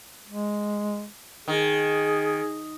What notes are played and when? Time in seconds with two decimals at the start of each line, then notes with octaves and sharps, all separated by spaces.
0.28 G#3
1.48 D#3 G#4